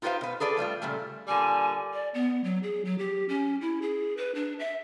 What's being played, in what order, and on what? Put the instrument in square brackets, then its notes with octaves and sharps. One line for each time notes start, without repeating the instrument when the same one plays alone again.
[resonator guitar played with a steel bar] D#4 F4 G4 B4 C5 F5
B2 B4
G#4 A4 B4 D5
F3 G3 A3 F4
A#2 C#3 G3 A3
[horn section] A#2 D3 G3 [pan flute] G#5
[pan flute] D5
B3
F#3
G#4
F#3
G4
C#4
E4
G#4
B4
D4
E5